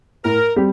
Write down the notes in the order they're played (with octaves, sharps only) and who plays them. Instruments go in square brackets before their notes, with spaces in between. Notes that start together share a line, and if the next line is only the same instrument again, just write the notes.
[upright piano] A2 [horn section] A#4
[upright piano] G3 C4 G4